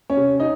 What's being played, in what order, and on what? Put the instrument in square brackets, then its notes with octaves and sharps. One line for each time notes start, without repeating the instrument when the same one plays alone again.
[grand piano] C#4 C#5
C3
D#4 D#5